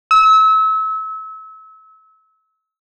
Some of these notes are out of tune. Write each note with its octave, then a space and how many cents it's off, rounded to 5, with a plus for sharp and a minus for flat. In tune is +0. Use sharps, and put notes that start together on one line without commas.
E6 -30